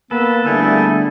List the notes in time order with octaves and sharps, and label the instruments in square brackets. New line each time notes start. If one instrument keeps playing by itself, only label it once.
[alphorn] A#3 [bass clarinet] B3 [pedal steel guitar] A4 [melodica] B4
[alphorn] D3 [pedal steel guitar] G3 A3 G#4 [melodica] E4 A4